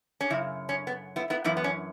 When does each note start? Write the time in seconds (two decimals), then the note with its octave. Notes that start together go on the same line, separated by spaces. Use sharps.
0.21 C#4
0.30 F#2 C#3 E4
0.69 C#4
0.87 B3
1.16 B3 E4
1.30 B3 E4
1.44 F#2 E3 B3 E4
1.57 B3
1.64 C#4